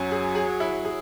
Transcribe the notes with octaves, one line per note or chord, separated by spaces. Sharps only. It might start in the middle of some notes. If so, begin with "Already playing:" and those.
Already playing: F#2 F#3
G#4
G#4
E4
G#4